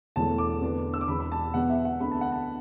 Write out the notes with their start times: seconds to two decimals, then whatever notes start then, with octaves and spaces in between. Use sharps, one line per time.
0.16 E1 E2 E3 A3 A5
0.38 D6
0.62 E2 D3 B3 D4
0.94 E6
1.01 D6
1.07 E1 E2 E3 B3 B5
1.20 B5
1.32 A5
1.54 E2 B2 B3 F#5
1.70 E5
1.85 F#5
2.00 D2 D3 B3 D4 B5
2.11 A5
2.21 F#5
2.32 A5